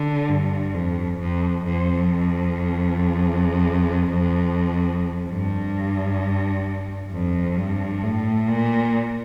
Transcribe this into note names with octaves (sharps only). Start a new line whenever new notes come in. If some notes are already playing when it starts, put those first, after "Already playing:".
Already playing: D3
G2
F2
F2
F2
G2
F2
G2
A2
A#2